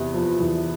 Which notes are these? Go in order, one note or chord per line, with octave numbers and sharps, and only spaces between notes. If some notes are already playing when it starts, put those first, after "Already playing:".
Already playing: E2 C3 B3
F3
E2